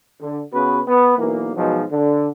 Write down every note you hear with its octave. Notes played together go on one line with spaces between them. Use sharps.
D3
C#3 B3 F#4 B4
B3
B1 E3 A#3
G#2 B2 F3 F#3
D3